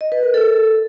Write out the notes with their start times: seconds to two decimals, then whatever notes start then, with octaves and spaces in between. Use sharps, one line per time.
0.01 D#5
0.12 B4
0.23 A#4
0.34 A4